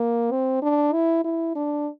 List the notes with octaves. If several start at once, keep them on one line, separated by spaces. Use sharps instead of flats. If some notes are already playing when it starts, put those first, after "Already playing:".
Already playing: A#3
C4
D4
E4
E4
D4